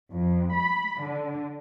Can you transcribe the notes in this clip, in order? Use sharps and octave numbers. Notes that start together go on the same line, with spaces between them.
F2
B5
D3